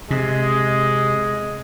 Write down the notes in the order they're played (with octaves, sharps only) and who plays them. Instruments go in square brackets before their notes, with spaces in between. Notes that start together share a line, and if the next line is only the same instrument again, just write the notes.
[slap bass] C3 [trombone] G#3